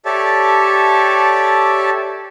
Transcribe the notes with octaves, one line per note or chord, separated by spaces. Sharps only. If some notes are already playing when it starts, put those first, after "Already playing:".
G4 A4 C#5 D5 E5 A5